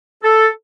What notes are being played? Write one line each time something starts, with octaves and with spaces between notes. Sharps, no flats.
A4